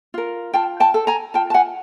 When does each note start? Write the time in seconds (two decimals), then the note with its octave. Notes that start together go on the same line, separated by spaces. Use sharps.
0.14 F4 A#4
0.54 F4 G5 A5
0.80 G5 A5
0.94 A4
1.07 G#5 A#5
1.34 F4 G5 A5
1.50 A5
1.54 F#5 G#5